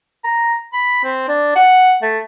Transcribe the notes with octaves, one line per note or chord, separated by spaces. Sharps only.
A#5
B5
C4
D4
F#5
A3